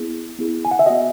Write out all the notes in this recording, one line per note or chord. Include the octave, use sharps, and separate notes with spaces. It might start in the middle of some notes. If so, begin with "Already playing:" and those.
Already playing: B3 E4 G#4
B3 E4 G#4
G#5
F#5
E5
B3 F#4 D#5